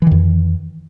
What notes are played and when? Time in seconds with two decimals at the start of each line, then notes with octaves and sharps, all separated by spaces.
0.02 E3
0.07 D#3
0.11 F2